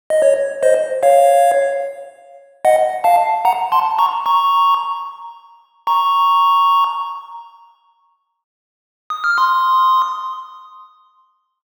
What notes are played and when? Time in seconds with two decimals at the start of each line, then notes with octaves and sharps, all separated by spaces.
0.10 D#5
0.22 C#5
0.63 C5 D#5
1.03 C#5 F5
2.65 D#5 F#5
3.04 F5 A5
3.45 F#5 A#5
3.72 A5 C6
3.98 A#5 C#6
4.26 A#5 C#6
5.87 A#5 C#6
9.10 D#6
9.24 F6
9.38 C6 D#6